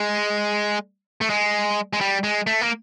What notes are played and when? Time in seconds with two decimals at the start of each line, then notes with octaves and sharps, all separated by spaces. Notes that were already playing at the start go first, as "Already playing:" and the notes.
Already playing: G#3
1.21 A3
1.30 G#3
1.93 G#3
2.01 G3
2.24 G#3
2.47 A3
2.61 A#3